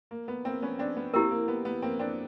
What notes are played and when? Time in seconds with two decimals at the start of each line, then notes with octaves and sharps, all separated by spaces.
0.11 A#3
0.28 B3
0.45 A#3 C4
0.62 B3 C#4
0.79 C4 D4
0.97 B3
1.14 A#3 C4 E4 G4 A#4
1.31 A#3
1.48 B3
1.65 B3
1.82 A#3 C4
1.99 C4 D4